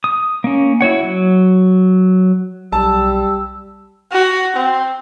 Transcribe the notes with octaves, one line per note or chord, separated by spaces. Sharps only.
D#6
A#3 C#4
E4 F#4 C#5 F#5
F#3
B1 G3 A5 E6
F#4
C4